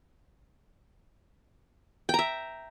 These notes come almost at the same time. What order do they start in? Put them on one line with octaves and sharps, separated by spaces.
G5 A#5 E5